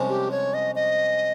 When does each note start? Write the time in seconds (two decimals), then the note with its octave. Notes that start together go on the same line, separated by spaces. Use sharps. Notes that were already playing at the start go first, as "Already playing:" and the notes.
Already playing: C2 C3 F3 G#3 C#4
0.09 G4
0.31 C#5
0.54 D#5
0.75 D#5